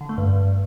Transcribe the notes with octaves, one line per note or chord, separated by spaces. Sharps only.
D3
A3
G2